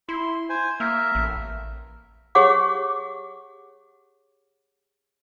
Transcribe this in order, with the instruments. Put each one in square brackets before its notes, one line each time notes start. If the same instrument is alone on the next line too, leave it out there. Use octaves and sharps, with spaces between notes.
[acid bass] E4 [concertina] C6
[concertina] C5 G#5
[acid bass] A#3 [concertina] A#4 E5
[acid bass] A1
[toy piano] G4 G#4 C#5 F#5 D6